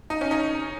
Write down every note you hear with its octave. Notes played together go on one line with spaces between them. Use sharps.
D#4
C#4
D#4